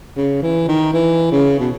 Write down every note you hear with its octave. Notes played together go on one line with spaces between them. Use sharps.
C#3
E3
D#3
E3
C#3
B2